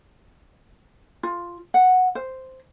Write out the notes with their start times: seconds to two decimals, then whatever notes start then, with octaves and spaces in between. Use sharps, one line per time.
1.23 F4
1.74 F#5
2.15 C5